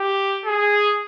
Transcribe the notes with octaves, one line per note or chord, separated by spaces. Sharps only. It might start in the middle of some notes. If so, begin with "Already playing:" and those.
Already playing: G4
G#4